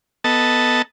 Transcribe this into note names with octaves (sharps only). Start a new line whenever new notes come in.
B3 A4 D#5 A5